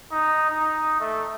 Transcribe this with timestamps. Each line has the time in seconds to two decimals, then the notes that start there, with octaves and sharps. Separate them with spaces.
0.12 D#4
0.50 D#4
1.00 A3